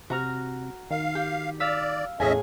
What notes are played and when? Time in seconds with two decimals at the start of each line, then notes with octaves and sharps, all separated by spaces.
0.10 C3 F#4 A#5 F6
0.90 D#3 F5
1.15 G4
1.60 D5 F5 E6 B6
2.20 E2 A2 C#4 G#4 D#5 E5 G#5